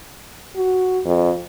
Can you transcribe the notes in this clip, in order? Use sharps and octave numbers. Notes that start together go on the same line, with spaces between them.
F#4
F2